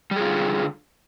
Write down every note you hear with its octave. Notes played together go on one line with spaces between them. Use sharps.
D3 G3 F4 G#4